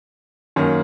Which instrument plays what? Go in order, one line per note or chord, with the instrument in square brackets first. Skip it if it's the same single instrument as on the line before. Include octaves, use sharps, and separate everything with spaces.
[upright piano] F#2 D#3 A#3 C#4